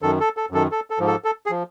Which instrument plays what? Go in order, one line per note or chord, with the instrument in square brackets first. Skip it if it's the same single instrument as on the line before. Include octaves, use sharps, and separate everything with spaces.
[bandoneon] F#2 D#3 A4
A4
A4
F#2 D#3 A4
A4
A4
G#2 F3
A4
A4
G#4
F3